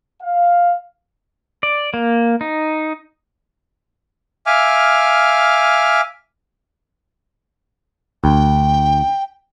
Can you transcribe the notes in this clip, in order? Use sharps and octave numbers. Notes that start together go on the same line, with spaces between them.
F5
D5
A#3
D#4
E5 F5 G#5 D6 F6
D2 G5